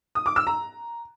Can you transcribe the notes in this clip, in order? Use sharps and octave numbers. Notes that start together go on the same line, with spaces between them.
D#6
D6
E6
A#5